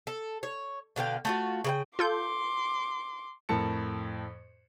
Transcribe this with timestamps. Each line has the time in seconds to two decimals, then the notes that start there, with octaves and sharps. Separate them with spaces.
0.07 A4
0.43 C#5
0.96 B2 D3 F5 G5
1.25 A3 F4 F#4
1.64 C#3 A#4 G5
1.99 F4 A4 C6 D6 G6
3.49 F2 A2 A#4 A5 C#7